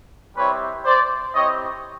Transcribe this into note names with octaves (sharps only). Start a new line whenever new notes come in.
G3 C4 E4 G4 B4 C#5
C5 D5
C4 E4 G4 C#5 D#5